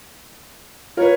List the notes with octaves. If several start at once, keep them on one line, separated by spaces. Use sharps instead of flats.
F4 A#4 B4 C#5